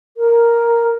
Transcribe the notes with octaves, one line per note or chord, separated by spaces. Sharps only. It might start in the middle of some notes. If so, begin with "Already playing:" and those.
A#4